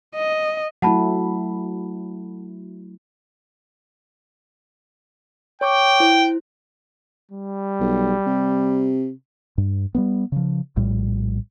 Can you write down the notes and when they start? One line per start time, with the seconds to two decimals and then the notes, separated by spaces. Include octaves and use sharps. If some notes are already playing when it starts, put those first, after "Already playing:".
0.16 D#5
0.82 F#3 A3 E4 F#5 A5 B5
5.61 C#5 G5 C#6 D6
6.00 E4 C5
7.31 G3
7.80 B1
8.26 C3
9.58 G2
9.95 G3 A#3 B3
10.32 C#3 F3
10.76 A#1 A2 G3